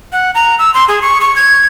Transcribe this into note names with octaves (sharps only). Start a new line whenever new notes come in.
F#5
A#5
E6
C6
G#4
C#6
C#6
G#6